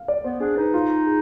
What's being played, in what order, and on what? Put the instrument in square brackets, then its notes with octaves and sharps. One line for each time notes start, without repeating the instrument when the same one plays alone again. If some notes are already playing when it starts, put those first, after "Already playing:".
Already playing: [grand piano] F5
D5
[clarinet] B3 [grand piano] C5
[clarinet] D4 [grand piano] G#4
[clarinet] D#4 [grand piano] B4
[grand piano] F4
G#4